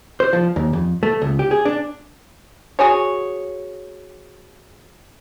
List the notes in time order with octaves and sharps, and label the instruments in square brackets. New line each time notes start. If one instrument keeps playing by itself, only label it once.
[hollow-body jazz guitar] C5
F3
D#2
F2
A3
C#2
G4
G#4
D4
[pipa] F#4 G#4 C#5